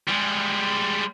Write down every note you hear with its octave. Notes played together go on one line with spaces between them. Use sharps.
G3 G#3